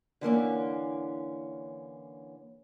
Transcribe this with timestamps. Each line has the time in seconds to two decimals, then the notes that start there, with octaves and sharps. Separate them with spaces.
0.21 D3 E3 A#3 C#4